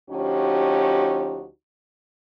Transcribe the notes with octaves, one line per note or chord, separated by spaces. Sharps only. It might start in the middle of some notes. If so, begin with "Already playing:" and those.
D2 F3 C#4 D#4 F#4 G4